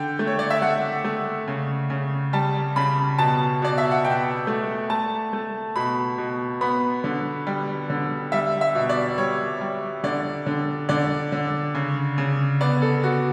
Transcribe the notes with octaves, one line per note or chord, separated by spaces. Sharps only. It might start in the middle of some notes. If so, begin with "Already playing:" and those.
Already playing: D3 G5
A3
C#5
D5
E5
A3 F#5
A3
C#3
C#3
G3 A5
C#3 B5
B2 A5
B2 D5
E5
F#5
B2 G5
A3
A3 A5
A3
B2 B5
B2
B3 B5
D3
G3
D3
G3 E5
E5
B2
D5
G3 C#5
G3
D3 D5
D3
D3 D5
D3
C#3
C#3
B3 D5
A4
B3 F#4